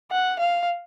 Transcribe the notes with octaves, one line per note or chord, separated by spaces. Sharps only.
F#5
F5